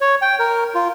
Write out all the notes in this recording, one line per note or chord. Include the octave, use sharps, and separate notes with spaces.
C#5
G5
A#4
F4